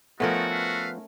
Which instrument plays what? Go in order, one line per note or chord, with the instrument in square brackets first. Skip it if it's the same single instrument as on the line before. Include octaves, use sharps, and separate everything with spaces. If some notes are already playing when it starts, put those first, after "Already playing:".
[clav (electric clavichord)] F3 B3 [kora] A3 C#4 A#4 [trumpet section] D#4 A4 [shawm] F#4
[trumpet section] A4 B4 F5